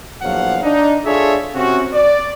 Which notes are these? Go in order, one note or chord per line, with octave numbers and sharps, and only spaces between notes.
A#1 E2 F3 F#3 F5 F#5
D4 D#4
D4 F4 G#4 A4 C#5 E5
C3 C4 C#4 F#4
D5